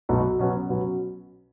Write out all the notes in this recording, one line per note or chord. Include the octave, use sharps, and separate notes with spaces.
B1 B2 B3 D#4 F#4
B2 F#3 C#4 F#4 B4
B2 F#3 C#4 F#4 B4